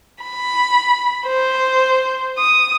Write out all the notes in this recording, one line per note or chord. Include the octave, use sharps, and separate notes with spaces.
B5
C5
D#6